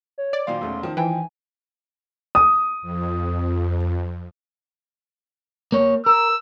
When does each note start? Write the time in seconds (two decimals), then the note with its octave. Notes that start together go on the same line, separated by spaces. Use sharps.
0.18 C#5
0.33 D5
0.47 A#2 D#3 F#3 D#4 C5 F5 C6
0.61 E1 A3 C#4
0.83 D#3 F3 A#4 A5
0.97 E3 C5 G5 G#5
2.35 D#6
2.82 F2
5.72 A#3 C#5
6.06 A#4 E6